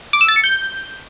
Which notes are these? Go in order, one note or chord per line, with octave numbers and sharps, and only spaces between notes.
D6
E6
A6
C#7
G6